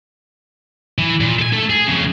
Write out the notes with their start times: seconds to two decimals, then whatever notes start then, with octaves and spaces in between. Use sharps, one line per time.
0.99 E3
1.21 A#2
1.39 A4 G#5
1.53 A3 A4
1.70 G#4
1.87 F2 C#3